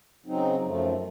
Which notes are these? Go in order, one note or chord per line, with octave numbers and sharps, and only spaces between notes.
C#3 F#3 C4 D#4
F#2 F3 A3